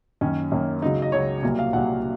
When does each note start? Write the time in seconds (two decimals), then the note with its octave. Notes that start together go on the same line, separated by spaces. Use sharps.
0.21 F#2 D#3 A#3 C#4
0.52 F#2 D#3 A#3
0.82 C#2 C#3 F#3 D#4
1.02 D#5
1.12 C#2 C#3 F#3 C#5
1.43 C2 A#2 F#3 A#3
1.59 F5
1.73 C2 A#2 F#3 A#3 F#5